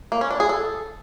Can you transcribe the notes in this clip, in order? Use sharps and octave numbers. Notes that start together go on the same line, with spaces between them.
A#3
C#4
D4
G#4
A4